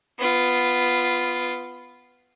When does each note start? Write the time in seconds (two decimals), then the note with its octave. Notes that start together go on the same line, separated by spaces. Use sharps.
0.19 B3 F4